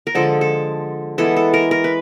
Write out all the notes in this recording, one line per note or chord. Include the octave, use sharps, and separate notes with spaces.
A#4
D3 F3 G#3 A4
A4
E3 G#3 B3 A4
A4
A#4
A#4
B4